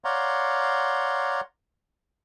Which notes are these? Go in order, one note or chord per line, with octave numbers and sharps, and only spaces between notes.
C#5 D5 F5 F#5 A#5 C6